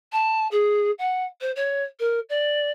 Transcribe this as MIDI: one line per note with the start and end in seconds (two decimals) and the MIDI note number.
0.12 0.48 81
0.51 0.91 68
0.99 1.24 78
1.41 1.51 72
1.56 1.83 73
2.00 2.20 70
2.29 2.71 74